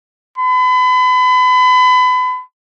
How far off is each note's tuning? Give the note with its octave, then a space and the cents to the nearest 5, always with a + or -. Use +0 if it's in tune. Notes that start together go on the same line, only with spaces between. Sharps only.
B5 +35